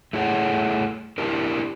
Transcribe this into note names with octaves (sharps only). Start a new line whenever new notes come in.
A3 E4 G#4 C#5 F#5
D4 E4 G4 A#4